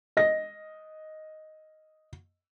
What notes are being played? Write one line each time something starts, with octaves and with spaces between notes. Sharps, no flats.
D#5 A#6